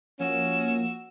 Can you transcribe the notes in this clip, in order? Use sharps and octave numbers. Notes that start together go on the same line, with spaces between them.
F3 A#3 C#4 F#4 E6